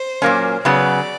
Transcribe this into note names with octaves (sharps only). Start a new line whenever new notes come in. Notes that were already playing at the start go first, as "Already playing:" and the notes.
Already playing: C5
A#2 F#3 A#3 C#4
C#3 F#3 B3 D5